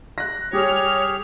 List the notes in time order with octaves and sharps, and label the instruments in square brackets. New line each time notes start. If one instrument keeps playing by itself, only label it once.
[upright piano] F#6 A#6
[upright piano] G3 [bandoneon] G4 G#4 [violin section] C#5 F6